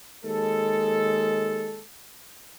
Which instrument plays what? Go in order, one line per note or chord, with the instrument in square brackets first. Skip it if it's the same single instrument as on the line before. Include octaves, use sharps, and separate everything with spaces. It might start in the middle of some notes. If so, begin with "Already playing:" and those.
[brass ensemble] D#2 G#3 A4